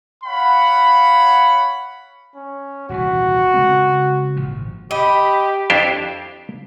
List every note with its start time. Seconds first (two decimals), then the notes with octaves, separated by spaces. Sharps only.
0.24 C#5 F5 F#5 B5
2.35 C#4
2.89 D#1 C2 E3 F#4
3.54 C#3 G#3 C4
4.36 G#1 A#2 F3
4.91 G4 D#5 B5
5.70 F2 D4 E4 G4 C5